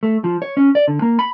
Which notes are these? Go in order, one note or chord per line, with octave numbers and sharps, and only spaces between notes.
A3
F3
C#5
C#4
D5
D3
A#3
B5